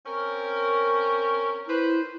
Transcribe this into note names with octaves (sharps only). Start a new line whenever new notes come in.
C4 C#4 A#4
E4 B4 C5